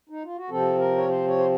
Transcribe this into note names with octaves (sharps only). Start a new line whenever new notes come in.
D#4
F4
F#4
C3 F3 C4 A4
A#4
C#5
C5
C#5
C5